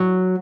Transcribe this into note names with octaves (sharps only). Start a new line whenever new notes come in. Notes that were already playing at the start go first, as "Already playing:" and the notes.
Already playing: F#3